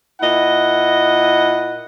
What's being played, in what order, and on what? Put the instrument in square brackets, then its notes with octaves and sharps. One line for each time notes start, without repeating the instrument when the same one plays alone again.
[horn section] A#2 E4 D#5 F#5